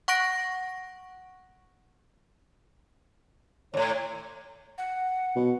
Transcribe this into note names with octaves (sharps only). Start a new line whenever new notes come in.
F#5 C#6 F#6 A#6 D7
D#2 A2 C#5
F#5
B2